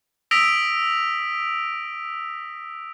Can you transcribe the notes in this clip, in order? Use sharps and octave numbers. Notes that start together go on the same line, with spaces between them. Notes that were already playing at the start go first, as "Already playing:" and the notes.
D#6 E6 A#6 B6 D7 F7